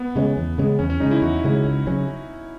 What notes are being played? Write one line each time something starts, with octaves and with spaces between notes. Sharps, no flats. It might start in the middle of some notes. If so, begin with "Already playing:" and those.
Already playing: B3
C#3 G#3 C#4
E2
C#3 G#3 C#4
E2 C#4
C#4
C#3 G#3 C#4 D#4
E4
E2 F#4
C#3 G#3 C#4
C#2
C#3 F#3 C#4